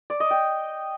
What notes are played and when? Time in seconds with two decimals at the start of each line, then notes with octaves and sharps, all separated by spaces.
0.10 D5
0.20 D#5
0.31 G5